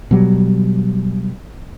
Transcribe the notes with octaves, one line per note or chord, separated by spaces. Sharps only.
B2 F#3 G3